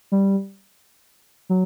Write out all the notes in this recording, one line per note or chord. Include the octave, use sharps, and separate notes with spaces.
G3
F#3